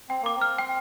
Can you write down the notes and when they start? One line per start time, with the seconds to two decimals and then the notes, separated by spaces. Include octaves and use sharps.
0.09 C4 G5
0.22 A#3 D6
0.36 C4
0.41 F6
0.58 G5